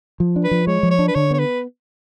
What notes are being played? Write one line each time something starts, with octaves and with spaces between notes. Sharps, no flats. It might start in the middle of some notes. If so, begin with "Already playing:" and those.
F3
D4
B4
F3
G#3 C#5
F3
C#5
D4
B4
D3 C#5
B3 C#5
B4